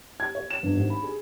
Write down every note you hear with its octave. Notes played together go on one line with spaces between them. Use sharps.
G#6
C#5
E7
G1
G#1
B5
G#4